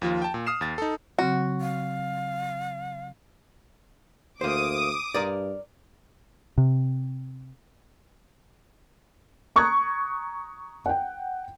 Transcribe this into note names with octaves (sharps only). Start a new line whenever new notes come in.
D#2 F3 F4
G5 A5
A#2
D#6 F6 C7 E7
D#2 A6
D#4 A4
C#3 F#3 C4 F#4
F5
D2 A#3 C5 D6 D#6
G2 A#4 D5
C3
A#5 C#6 D#6 F#6 G#6
F#5 G5